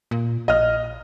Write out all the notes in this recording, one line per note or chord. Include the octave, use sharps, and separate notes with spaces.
A#2
A#1 D#5 F6